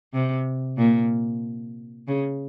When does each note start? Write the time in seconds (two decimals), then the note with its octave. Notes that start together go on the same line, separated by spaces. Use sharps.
0.14 C3
0.78 A#2
2.08 C#3